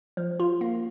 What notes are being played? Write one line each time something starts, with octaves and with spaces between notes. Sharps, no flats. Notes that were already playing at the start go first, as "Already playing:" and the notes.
F3
F4
A#3